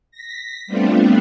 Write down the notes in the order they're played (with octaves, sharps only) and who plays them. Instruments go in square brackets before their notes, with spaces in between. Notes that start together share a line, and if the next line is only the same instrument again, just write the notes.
[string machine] A#6 B6
G3 A3 B3 C4 D4 F4